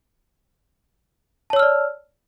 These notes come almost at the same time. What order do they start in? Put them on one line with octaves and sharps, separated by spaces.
A5 C#5 E6 F6 D5